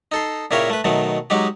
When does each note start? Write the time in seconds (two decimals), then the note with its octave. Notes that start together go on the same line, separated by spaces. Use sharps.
0.12 D#4 A4 C6
0.51 A#2 C#3 E4 A#4 C#5 G5
0.70 A3 B4
0.84 B2 D#3 F#3 A3
1.30 F#3 G#3 D#4 G4